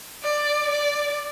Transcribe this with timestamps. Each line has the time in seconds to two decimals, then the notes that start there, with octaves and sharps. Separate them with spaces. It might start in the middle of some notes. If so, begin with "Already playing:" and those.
0.23 D5
0.71 D5